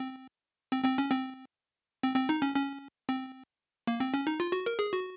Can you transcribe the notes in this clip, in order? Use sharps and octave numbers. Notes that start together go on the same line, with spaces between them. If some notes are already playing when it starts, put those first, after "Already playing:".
Already playing: C4
C4
C4
C#4
C4
C4
C4
D#4
C#4
C#4
C4
A#3
C4
C#4
D#4
F4
F#4
A#4
G#4
F#4